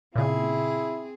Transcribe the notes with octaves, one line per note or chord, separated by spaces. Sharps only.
A#2 C#3 C4 E4 G#4